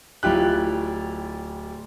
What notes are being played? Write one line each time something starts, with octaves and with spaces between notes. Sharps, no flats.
D1 E4 F4 G4 F#6